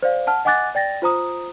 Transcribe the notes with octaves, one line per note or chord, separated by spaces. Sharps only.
C5 D5 F5
F#5 A5 F6
D#5 F#5 G#5 D6 F#6 A6
D5 G5 A6 A#6
F4 C5 A#5 D#6